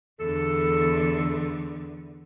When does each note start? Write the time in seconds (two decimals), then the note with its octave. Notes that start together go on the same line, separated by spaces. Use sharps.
0.20 E2 D3 A4